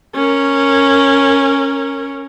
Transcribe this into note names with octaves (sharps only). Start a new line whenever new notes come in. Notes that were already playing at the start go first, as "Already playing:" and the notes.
C#4 A#4